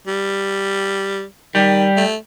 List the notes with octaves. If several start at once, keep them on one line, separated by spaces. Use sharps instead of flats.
G3
D#3 G3
A3